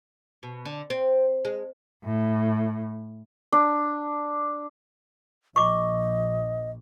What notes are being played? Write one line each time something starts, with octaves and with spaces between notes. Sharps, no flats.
B2
D3
C4
G#3
A2
D4
A#1 D#5 C#6 D6